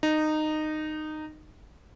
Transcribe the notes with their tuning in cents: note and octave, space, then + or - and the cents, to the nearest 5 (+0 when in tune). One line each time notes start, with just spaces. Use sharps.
D#4 -15